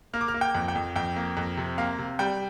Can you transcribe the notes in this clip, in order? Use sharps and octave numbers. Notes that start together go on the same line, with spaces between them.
A#3 F6
D6
F6
A#3
G5
F2
G5
F2
F2 G5
A#3
F2
C3
A#3 F5
C3
G3 G5